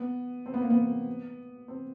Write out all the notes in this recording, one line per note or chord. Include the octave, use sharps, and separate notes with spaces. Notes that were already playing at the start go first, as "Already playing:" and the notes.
Already playing: B3
C4
B3
A#3
B3
C4